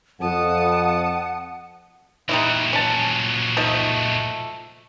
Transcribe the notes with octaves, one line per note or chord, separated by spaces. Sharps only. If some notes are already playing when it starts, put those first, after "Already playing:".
F2 F#5 A5 D#6
A#2 F#3 G3 D#4 E4
C#4 A5
F3 A3 D#4